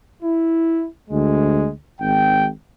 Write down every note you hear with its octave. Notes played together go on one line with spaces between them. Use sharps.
E4
D2 G#3
G#1 G5